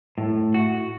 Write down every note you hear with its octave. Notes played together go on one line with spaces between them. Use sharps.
A2
F#4